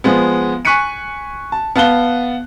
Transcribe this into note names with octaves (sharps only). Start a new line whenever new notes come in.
F3 G#3 B3
G#5 C#6 F#6 B6 C#7 D#7
A5
B3 F5 A5 F#6 G7